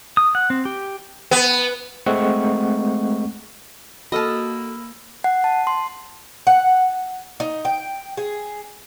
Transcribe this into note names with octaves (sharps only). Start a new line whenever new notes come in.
D#6
F#5
C4
G4
B3
G#3 A3 C4 F#5 C#6
A#3 F#4 A4 D#5 A5 B5 E6 F6
F#5
A5
C6
F#5
D#4
G5
G#4